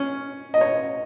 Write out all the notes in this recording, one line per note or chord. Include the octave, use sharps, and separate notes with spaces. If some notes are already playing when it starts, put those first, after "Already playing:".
Already playing: C#4
D#5
C#5